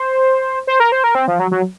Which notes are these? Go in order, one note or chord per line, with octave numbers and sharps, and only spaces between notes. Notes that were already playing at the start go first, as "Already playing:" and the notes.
Already playing: C5
C5
A#4
C5
A#4
C4
F3
F#3
F#3